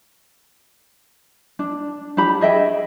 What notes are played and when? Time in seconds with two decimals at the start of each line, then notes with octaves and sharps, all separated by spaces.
1.59 D4
2.17 D4 G4 B5
2.41 G#4 D#5 E5 G5